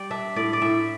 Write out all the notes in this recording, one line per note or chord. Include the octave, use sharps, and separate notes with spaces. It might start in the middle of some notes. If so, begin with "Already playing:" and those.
Already playing: G3 D5
D4 E5
A2 D5
D5
A2 E5